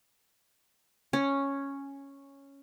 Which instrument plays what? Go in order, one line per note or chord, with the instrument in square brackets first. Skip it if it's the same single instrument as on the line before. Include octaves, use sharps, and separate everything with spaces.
[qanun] C#4